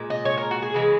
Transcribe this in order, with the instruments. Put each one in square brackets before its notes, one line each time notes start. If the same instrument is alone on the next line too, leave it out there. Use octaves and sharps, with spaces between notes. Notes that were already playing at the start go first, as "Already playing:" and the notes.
Already playing: [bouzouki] A#2 G#3
D#5
C#5
A#4
F#4
G#4
C#3 E3 G#3